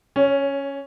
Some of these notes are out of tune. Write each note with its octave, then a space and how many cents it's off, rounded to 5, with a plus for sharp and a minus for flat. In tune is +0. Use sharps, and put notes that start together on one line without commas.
C#4 +0 C#5 +25